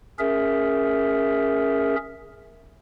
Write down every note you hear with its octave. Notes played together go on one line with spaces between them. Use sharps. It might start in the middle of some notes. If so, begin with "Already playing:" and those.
C#4 G#4 A#4 E5